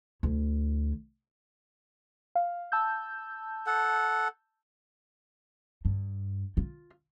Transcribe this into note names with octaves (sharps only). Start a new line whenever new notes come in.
D2 E4
F5
A5 E6 G6
A4 F#5
G2
F4